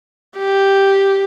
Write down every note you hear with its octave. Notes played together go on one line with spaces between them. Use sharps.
G4